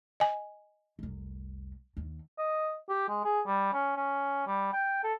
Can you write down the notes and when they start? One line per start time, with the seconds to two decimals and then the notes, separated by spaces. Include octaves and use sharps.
0.20 D#5 G#5
0.99 F1 C2
1.97 D#2
2.38 D#5
2.89 G4
3.08 G#3
3.24 G#4
3.46 G3
3.73 C#4
3.96 C#4
4.47 G3
4.73 G5
5.03 A4